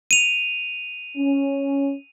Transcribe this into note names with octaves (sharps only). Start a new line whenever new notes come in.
D#7 F7
C#4